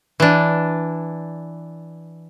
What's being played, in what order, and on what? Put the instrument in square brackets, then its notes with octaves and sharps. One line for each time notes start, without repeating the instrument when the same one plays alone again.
[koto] E3 D4